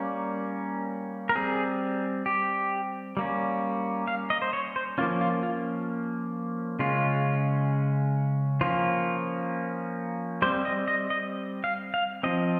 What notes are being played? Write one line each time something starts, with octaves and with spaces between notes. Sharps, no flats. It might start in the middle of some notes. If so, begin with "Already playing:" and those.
Already playing: G3 A#3 C#4
A#4
G3 C4 G#4
G4
G3 A#3 C#4
F5
D#5
C5
C#5
C5
F3 A#3 C#4 F4
F4
F4
C#3 G#3 C#4 F4
F3 A#3 C#4 F4
G3 C4 C5
D#5
D#5
D#5
F5
F5
F3 C4 D#5